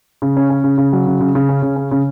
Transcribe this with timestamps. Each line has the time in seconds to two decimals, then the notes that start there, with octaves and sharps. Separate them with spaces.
0.22 C#3
0.37 C#4
0.50 C#4
0.64 C#3
0.78 C#3
0.93 F#3
1.06 C#3
1.20 C#3
1.35 C#3
1.49 C#4
1.62 C#3
1.76 C#4
1.91 C#3